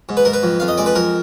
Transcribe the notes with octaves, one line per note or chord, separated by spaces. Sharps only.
G#2
B4
G#2 A#4
B4
F2
F2 F5
D#5
G#3 D5
B4
F2 A#4